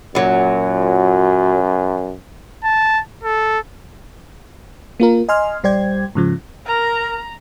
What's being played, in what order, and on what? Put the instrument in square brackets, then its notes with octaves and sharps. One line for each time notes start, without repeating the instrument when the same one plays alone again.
[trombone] F#2 [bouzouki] A#2 F#3
[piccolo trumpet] A5
A4
[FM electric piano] A#3 F4 A#4
D#5 G#5 C6 F6
A#1 G3 C5 D5 G5 G#6
G#2 C#3 F3
[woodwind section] A#4 [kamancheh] A#5